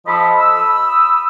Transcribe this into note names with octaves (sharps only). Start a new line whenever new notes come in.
F3 A4 D#5 A5 B5
B5 D#6 E6